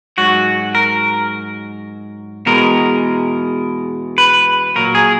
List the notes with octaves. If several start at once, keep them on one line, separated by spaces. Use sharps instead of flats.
G#2 F#3 F#4
A#4
E2 B2 G#3 A#4
B4
A#2 F#3 A#4
G#4